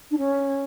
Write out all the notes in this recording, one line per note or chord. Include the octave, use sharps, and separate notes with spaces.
D4
C#4